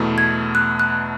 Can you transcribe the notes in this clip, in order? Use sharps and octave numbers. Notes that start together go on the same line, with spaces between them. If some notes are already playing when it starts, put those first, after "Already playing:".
Already playing: E2 B2 A3 E4
G#6
F#6
F#6